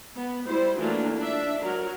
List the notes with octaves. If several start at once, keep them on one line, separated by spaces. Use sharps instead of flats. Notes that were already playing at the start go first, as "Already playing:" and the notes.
B3
G3 E4 C5
E3 F#3 A3 A#3 D4 F4
D4 E5
F#3 A#4